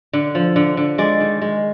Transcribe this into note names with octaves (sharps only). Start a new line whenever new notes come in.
D3
F3
D3
D3
G#3 D5
D#3
G#3